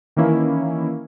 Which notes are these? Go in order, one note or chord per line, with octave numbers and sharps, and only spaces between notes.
D#3 E3 A#3 C#4 E4